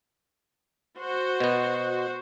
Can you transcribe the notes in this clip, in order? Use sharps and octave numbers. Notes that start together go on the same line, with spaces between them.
F#4 C5
B2 B3